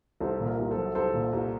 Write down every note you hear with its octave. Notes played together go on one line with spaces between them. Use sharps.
C2 A4 C5
A#2
A#4
C2
A4 C5
F#3
C2 A4 C5
A#2
C2